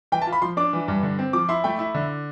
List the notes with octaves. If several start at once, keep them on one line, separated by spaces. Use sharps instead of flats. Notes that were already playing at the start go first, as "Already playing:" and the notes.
E3 G5
A5
F4
B5
F3 C6
D4 D6
E3
G2
D3
C4
F3 D6
E4 C6
A3 G5
E4
D3